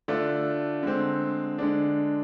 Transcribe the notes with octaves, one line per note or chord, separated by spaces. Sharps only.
D3 A3 D4 F4
D3 G#3 C4
D3 G#3 D4